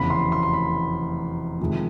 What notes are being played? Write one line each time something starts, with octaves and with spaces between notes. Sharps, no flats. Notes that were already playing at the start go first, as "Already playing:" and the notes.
Already playing: F1 E2 C#3 B5
C6
C6
C6
B5
F1 F2 C3 D#3 G#3